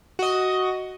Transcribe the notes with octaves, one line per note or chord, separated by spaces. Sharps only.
F#4 D#5